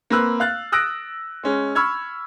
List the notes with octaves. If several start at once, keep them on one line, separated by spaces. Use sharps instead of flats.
A#3 C4 B4 E6 F#6
F5 F#6 A6
D#6 E6 F#6 A#6 D7
G#3 C#4
B5 C#6 E6 F6 G#6